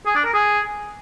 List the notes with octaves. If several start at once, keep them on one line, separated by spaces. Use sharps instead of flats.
G#4
D4
A#4
G#4